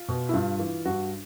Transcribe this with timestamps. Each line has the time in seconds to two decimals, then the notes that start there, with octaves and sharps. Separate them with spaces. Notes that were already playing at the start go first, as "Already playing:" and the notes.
Already playing: F4
0.08 B2
0.29 E4
0.34 G2 F4
0.59 E3
0.85 G2 F#4